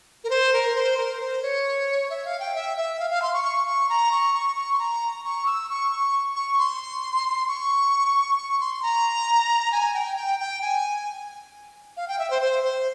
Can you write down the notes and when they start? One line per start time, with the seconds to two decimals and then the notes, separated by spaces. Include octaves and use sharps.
0.24 A#4
0.30 C5
0.53 A#4
0.76 C5
0.98 A#4
1.20 C5
1.42 C#5
2.10 E5
2.25 F5
2.40 G5
2.55 E5
2.77 E5
3.00 F5
3.11 F5
3.22 C6
3.33 C#6
3.44 C#6
3.67 C#6
3.89 A#5
4.12 C#6
4.34 C#6
4.56 C#6
4.73 C6
4.79 A#5
5.24 C#6
5.46 E6
5.69 C#6
5.91 C#6
6.36 C#6
6.58 C6
7.48 C#6
8.38 C#6
8.60 C6
8.83 A#5
9.72 G#5
9.94 G5
10.17 G5
10.40 G5
10.62 G#5
11.97 F5
12.08 G5
12.19 E5
12.30 C5
12.42 C5
12.64 C5